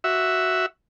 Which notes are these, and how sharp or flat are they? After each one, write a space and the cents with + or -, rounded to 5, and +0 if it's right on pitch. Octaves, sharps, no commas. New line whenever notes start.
F#4 +0 E5 +0